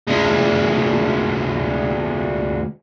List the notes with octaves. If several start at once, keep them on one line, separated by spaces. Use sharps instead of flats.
D2 G#3